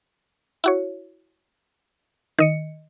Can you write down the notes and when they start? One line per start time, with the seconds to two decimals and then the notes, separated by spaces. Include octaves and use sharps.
0.64 E4 F#4 C#5
2.39 D#3 D#5 C#7